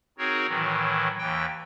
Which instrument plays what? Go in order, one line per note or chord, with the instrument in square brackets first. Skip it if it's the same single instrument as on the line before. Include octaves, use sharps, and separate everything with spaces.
[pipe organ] C4 D#4 F#4 G#4 A#4 C#5
A2 D#3 E3 F#3
D#2 E3 G5